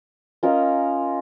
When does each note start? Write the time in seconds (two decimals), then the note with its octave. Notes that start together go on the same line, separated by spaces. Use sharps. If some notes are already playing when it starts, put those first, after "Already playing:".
0.43 C#4 F4 A#4 D#5